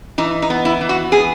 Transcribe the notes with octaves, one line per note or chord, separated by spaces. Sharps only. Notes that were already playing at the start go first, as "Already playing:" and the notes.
E3 D#4
D#4
B3
E4
E3
F#4
B3 G#4